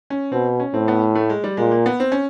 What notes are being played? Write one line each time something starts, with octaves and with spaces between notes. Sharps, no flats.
C#4
B2 C4
C#4
A2 C4
B3
A3
G#3
G3
A#2 G#3
A#3
B3
C4
C#4